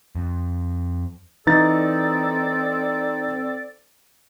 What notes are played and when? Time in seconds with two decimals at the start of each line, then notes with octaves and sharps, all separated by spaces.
0.16 F2
1.47 E3 C4 D#4 A4 D5 A6